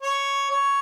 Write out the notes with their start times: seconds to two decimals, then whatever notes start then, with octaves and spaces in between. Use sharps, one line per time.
0.02 C#5
0.50 C#5